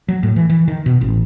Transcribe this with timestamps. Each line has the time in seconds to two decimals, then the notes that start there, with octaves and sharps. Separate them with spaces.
0.08 F#3
0.23 A2
0.36 E3
0.50 E3
0.68 D#3
0.86 B2
1.01 A1